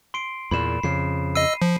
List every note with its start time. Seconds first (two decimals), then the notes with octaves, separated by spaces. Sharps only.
0.14 C6 C7 D7
0.51 E2 A#2 B5 E7
0.83 F2 C#3 C7
1.35 D#5 E6 C7 D#7
1.62 F3